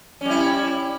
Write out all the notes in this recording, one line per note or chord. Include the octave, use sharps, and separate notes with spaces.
G3 C#4 E4